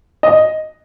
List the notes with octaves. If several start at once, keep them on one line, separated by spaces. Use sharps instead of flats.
D#5